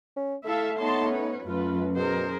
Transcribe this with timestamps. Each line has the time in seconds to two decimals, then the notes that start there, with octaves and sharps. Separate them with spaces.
0.17 C#4
0.45 A3 E4 A4 E5 F5
0.78 B3 D#4 C#5 A5 C6
1.11 C#4 B4
1.44 F#2 A3 F4 B4
1.96 B2 G#4 A#4 C5